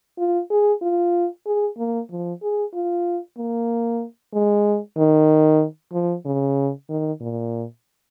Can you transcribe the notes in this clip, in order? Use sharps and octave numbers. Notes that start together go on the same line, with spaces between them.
F4
G#4
F4
G#4
A#3
F3
G#4
F4
A#3
G#3
D#3
F3
C#3
D#3
A#2